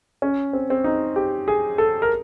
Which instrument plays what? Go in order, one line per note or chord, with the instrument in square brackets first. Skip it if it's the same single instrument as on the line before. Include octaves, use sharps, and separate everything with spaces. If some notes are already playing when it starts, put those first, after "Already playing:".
[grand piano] C#4
C4
C4
D#4
G4
G#4
A4
A#4